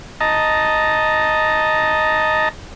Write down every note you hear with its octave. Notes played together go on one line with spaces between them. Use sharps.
D#5 A5 A#5